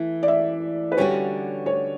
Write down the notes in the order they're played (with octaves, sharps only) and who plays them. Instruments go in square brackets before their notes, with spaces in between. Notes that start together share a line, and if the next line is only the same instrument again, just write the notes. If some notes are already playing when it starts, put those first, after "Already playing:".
Already playing: [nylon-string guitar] E3 A3 E4
[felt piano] D5
E5
B4
[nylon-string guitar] D3 G3 C#4 F#4 [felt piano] C#5
[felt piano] C#5